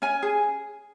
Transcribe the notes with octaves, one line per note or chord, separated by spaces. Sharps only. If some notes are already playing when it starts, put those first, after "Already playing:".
C#4 G#5
G#4